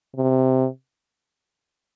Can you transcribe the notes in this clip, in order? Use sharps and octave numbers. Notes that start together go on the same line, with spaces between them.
C3